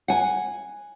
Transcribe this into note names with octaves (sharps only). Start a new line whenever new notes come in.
F#5 G#5